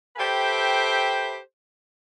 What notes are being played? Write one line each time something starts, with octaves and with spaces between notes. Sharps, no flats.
G4 A4 B4 C5 E5 G5